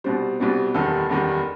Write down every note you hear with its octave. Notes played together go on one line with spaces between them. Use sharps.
C2 B2 G3 C5
C2 B2 G3
F#1 E2 D#3 G3 A4
F#1 E2 D#3 G3